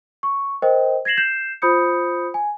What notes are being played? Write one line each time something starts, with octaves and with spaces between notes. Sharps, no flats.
C#6
A#4 C5 D#5 G5
G#6 A#6 C7 E7 F#7
G6 C7 E7
F4 C5 B5 D#6 G6 C#7
G#5